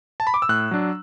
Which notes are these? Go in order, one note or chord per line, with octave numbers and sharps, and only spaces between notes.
A5
B5
D6
E6
A2 F#6
F#3 D4